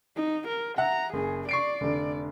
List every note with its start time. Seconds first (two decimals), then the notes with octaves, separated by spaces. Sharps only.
0.16 D#4
0.48 A#4
0.78 E5 F#5 A#5
1.13 F#1 G#4
1.49 D5 C#6 C7 D7
1.81 F1 D3